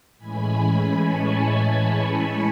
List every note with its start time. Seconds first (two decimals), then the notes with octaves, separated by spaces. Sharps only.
0.18 A2 E3 G#3 C#4 G#5 B5
1.01 A5 C#6